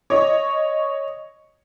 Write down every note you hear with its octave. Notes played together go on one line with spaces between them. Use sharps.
C#5 D#5